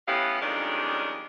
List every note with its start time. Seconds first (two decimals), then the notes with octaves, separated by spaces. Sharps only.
0.07 A2 B3 C#4 E4 G4 F5
0.40 F2 D#3 G3 G#3 C#4 D4